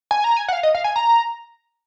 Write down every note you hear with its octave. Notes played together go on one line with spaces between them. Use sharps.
G#5
A#5
G#5
F#5
F5
D#5
F5
G#5
A#5